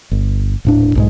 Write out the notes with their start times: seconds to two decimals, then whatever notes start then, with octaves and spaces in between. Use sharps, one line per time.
0.11 G1
0.65 D#1 A2 D4
0.95 B1 G#2 G#3